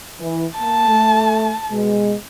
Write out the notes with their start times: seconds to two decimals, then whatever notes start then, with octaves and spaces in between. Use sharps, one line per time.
0.20 E3
0.58 A#3 A5
0.88 A3
1.71 B2 G#3